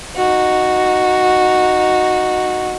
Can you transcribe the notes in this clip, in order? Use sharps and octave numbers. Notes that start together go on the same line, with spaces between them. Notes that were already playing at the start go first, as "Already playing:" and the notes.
D#4 F#4